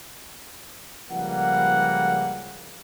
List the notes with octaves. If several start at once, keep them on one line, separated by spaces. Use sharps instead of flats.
C#2 F3 G3 A#3 F#5